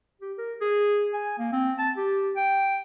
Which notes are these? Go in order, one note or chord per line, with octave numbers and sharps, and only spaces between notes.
G4
A#4
G#4
G#5
A#3
C4
A5
G4
G5